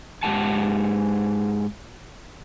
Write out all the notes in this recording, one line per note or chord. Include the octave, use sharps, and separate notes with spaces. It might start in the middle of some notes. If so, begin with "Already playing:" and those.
G#2 C4 G4 F#5 A5